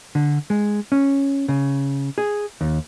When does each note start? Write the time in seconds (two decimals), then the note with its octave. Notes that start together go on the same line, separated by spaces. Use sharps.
0.15 D3
0.50 G#3
0.92 C#4
1.48 C#3
2.18 G#4
2.61 D#2